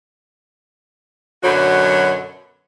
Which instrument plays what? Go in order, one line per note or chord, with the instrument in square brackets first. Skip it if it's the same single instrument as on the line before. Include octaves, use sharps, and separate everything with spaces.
[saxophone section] F#2 B2 D3 F#3 F#4